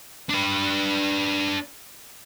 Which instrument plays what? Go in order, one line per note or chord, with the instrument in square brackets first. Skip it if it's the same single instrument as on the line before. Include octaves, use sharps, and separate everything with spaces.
[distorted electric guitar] D4 B4